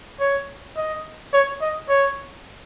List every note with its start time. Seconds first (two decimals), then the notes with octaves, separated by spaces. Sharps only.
0.20 C#5
0.77 D#5
1.33 C#5
1.61 D#5
1.89 C#5